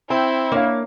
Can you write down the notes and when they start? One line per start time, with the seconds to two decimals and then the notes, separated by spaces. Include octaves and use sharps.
0.10 C4 E4 G5
0.52 A#3 D4 C#5 F5